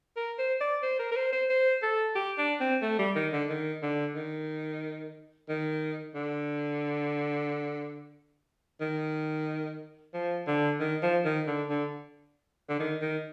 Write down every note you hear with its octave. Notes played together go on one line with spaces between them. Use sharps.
A#4
C5
D5
C5
A#4
A#4
C5
C5
C5
A4
G4
D4
C4
A3
G3
D#3
D3
D#3
D3
D#3
D#3
D3
D#3
F3
D3
D#3
F3
D#3
D3
D3
D3
D#3
D#3